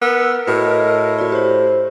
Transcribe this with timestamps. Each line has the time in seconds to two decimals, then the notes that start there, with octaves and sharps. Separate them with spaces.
0.02 B3 A#4 E6
0.47 A2 F#4 B4 D#5
1.18 F#4 D5
1.32 G4 C5 C#5